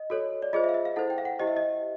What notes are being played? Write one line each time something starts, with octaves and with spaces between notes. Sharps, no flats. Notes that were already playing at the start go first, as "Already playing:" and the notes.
Already playing: D#5
F#4 A4 C#5
D5
F4 G#4 C5 D#5
E5
F5
E5
F5
E4 A4 C5 F#5
G5
F5
F#5
E4 G4 C5 D#5
E5
D#5